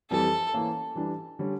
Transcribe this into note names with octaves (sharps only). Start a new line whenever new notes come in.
F2 E3 G3 A4
E3 A#3 C#4
E3 G3 D4
D3 G3 C#4